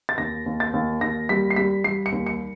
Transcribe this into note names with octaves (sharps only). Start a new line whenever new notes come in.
A6
D#2 A#6
D#2
A6
D#2
D#2 A#6
G3 B6
C7
G3 B6
G3 C7
C#7
D#2
C#7